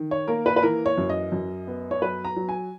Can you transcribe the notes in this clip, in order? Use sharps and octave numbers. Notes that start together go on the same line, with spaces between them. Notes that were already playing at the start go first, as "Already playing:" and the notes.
Already playing: D#3
C#5
A#3 A#4
B4
B4
E3 A#4
C#5
F#2
D#5
F#2
B3
C#5
F#3 B4
A#5
F#3
G#5